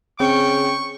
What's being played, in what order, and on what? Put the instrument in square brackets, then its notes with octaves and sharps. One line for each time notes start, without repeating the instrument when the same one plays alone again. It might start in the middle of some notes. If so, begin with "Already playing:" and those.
[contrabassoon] C#3 [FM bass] C4 [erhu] G5 [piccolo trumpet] C#6